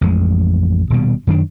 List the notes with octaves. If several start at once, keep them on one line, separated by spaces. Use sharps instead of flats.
A1 F2 G#3
D#1 B2 G3
F#2 D#3 D4